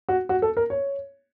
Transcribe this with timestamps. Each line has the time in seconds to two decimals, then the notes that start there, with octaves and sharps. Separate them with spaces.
0.09 F#4
0.29 F#4
0.42 A4
0.57 A#4
0.70 C#5